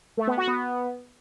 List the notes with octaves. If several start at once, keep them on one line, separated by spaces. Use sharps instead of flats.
A3
B3
F#4
B3